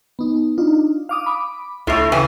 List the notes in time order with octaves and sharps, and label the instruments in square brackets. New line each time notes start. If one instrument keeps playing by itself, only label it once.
[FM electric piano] B3 D#4
D4 D#4 F4
F5 D6 D#6
B5 D6
[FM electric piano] C#2 F4 C7 [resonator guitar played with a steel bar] A2 A3
[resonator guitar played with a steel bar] C#3 E3 G#5